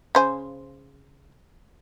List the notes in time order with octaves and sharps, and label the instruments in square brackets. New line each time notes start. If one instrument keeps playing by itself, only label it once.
[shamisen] C#3 C5 G#5